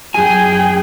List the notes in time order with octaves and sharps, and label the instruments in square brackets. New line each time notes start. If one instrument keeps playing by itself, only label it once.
[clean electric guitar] F#2 G#5 [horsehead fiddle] G#4 G5